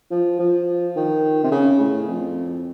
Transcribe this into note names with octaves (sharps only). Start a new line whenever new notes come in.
F3
F3
D#3
C3
C#3
A2
F2